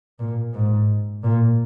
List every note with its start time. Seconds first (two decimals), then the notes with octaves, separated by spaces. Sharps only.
0.19 A#2
0.54 G#2
1.24 A#2